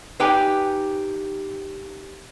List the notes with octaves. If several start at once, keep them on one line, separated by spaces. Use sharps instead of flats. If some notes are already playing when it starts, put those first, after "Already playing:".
D#4 G4 B4 G5 G#5